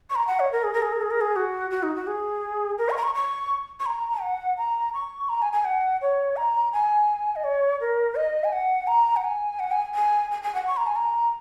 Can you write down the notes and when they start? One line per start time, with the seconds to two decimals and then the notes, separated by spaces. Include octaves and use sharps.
0.10 C#6
0.15 A#5
0.27 F#5
0.40 C#5
0.52 A#4
0.64 G#4
0.73 A#4
0.82 G#4
0.92 A#4
1.01 G#4
1.10 A#4
1.21 G#4
1.36 F#4
1.71 F#4
1.83 D#4
1.95 F#4
2.07 G#4
2.78 A#4
2.90 C#6
2.97 A#5
3.03 C#6
3.15 C#6
3.80 C#6
3.86 A#5
4.21 F#5
4.57 A#5
4.94 C#6
5.29 A#5
5.42 G#5
5.53 G#5
5.65 F#5
6.01 C#5
6.36 A#5
6.73 G#5
7.36 D#5
7.44 C#5
7.81 A#4
8.15 D#5
8.44 G#5
8.52 F#5
8.87 A#5
9.16 F#5
9.24 G#5
9.59 F#5
9.71 G#5
9.95 G#5
10.31 G#5
10.43 G#5
10.55 F#5
10.67 C#6
10.77 A#5
10.87 G#5
10.96 A#5